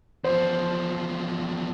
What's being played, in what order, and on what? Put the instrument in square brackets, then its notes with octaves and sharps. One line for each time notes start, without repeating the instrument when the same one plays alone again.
[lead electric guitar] E2 F3 [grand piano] C5